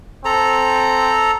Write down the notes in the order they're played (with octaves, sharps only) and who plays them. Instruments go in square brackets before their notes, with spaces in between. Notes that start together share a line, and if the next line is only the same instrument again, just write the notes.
[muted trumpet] C4 [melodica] A4 A#5